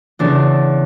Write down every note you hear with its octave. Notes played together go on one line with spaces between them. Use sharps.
E2 C#3 E3 D4